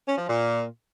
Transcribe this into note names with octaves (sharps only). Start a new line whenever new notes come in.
C#4
F3
A#2